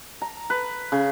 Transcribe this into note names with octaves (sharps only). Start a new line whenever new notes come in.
A#5
B4
C#3